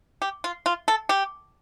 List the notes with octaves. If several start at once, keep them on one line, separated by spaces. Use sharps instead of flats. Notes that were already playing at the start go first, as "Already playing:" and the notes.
G4
F4
F4
A4
G4